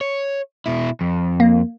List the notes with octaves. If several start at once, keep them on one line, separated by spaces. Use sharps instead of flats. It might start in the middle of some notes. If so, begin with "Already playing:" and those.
C#5
B2 E4
F2
A#3